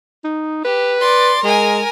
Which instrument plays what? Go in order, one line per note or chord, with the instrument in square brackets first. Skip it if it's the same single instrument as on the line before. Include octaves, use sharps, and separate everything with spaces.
[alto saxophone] D#4
[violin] G4 [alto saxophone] B4
[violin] D5 C6
[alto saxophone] G#3 [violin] A#4 G#5